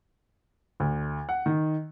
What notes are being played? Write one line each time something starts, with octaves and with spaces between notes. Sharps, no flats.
D2
F#5
D#3